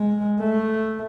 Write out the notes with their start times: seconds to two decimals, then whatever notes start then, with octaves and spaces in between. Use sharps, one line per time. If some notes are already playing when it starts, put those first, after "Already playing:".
Already playing: G#3
0.40 A3